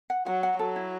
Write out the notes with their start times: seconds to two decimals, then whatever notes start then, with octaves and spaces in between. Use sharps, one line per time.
0.10 F#5
0.26 F#3 F#5
0.43 F#5
0.59 F#3 A4
0.76 E4